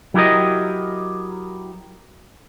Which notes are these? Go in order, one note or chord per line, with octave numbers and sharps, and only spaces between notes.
F#3 E4 G4 A#4 D#5